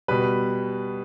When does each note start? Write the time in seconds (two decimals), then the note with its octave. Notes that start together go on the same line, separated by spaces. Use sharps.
0.08 B2 G3 B4